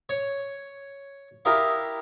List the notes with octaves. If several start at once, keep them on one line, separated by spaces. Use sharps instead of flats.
C#5
E4 G4 A#4 D#5 F5